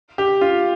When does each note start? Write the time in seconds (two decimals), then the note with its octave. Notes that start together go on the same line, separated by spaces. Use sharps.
0.18 G4
0.41 F4